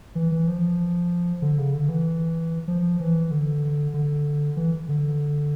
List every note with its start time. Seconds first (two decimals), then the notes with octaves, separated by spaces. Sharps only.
0.15 E3
0.32 E3
0.47 F3
1.42 D3
1.58 C#3
1.74 D3
1.88 E3
2.68 F3
3.00 E3
3.31 D3
3.94 D3
4.57 E3
4.89 D3